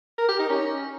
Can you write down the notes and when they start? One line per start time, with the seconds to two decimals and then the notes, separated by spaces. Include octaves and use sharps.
0.18 A#4
0.28 G4
0.39 D#4
0.49 C#4